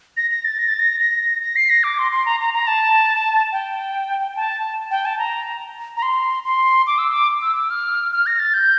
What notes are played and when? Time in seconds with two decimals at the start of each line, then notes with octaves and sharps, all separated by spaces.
0.17 A#6
0.31 A#6
0.44 A6
0.59 A#6
0.68 A6
0.79 A#6
1.00 A#6
1.42 A#6
1.56 C7
1.70 A#6
1.84 D6
1.99 C6
2.12 C6
2.26 A#5
2.40 A#5
2.54 A#5
2.67 A5
3.52 G5
4.36 A5
4.91 G5
5.05 A5
5.18 A#5
5.97 A#5
6.02 C6
6.45 C6
6.87 D6
6.98 E6
7.12 D6
7.42 E6
7.56 E6
7.70 F6
8.13 F6
8.26 A#6
8.39 A6
8.54 G6